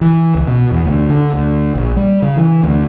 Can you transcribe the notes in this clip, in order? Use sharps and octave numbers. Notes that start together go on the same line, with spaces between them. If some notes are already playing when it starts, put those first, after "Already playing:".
E3
C#2
B2
E2
D2
D3
D2
A#1
G3
C#3
E3
D2